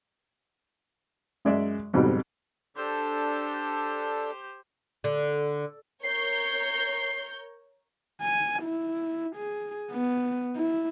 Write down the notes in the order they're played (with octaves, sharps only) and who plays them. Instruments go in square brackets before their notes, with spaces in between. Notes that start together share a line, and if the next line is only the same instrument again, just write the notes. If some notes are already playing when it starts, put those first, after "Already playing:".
[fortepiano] F#2 G#3 D5 E5
F2 G#2 B2 F#3 G3
[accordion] D4 A4 [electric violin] G4 C5
[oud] D3
[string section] A#4 C#5 G6 [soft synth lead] C7
[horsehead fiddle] G#5
E4
G#4
B3
E4